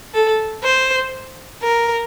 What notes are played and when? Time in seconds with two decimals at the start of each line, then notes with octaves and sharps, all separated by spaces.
0.14 A4
0.64 C5
1.62 A#4